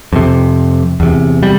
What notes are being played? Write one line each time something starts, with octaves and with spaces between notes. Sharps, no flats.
F2 C3
E2 C3
G3